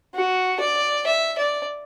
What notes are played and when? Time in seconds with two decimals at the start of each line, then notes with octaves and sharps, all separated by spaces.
0.15 F#4
0.60 D5
1.06 E5
1.38 D5